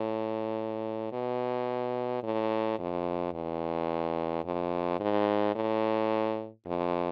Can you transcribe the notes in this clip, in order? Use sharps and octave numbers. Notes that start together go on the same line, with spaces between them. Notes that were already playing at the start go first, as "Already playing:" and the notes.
Already playing: A2
B2
A2
F2
E2
F2
G#2
A2
F2